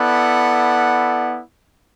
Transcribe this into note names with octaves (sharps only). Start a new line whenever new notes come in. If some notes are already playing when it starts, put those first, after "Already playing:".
Already playing: B3 E4 A4 D5 F#5